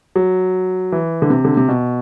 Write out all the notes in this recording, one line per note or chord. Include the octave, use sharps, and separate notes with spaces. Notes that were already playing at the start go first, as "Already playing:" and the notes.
F#3
E3
D3
C3
D3
C3
B2